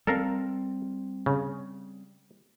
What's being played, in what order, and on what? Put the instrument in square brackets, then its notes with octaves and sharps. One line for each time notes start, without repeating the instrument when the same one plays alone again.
[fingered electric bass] G3 C4 [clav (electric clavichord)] A4 A#4 F5
[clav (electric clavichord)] C#3